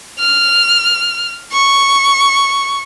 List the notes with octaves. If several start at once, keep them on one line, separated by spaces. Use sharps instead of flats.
F6
C#6